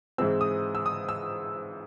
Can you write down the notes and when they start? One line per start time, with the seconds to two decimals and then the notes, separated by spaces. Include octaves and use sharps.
0.18 G#2 E3 G#3 C4 E6
0.41 D#6
0.75 E6
0.86 D#6
1.09 E6